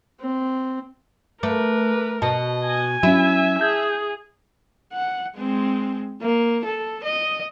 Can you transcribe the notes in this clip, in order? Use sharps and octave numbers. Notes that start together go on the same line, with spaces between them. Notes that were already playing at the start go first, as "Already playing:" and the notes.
C4
A3 A#4 B4 D6
B2 D#5 A5
G#5
F#3 C#4 E4 E5
G#4 A5 G6 G#6
F#5
G#3 C4
A#3
A4
D#5